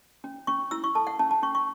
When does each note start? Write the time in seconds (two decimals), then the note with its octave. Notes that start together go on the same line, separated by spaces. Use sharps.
0.24 C#4
0.47 C#4 C#6
0.71 E4 E6
0.84 C#6
0.95 A4 A5
1.07 F#5
1.19 C#4 A5
1.31 A5
1.42 C#4 C#6
1.55 C#6